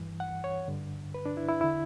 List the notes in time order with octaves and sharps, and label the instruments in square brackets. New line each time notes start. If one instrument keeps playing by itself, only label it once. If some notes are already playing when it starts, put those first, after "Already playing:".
Already playing: [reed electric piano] G2 E3
F#5
C#5
G2 D3
B4
D4
E4
E4
E2 D3 E4